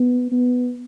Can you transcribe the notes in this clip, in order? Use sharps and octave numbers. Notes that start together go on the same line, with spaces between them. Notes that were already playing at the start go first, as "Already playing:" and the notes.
Already playing: B3
B3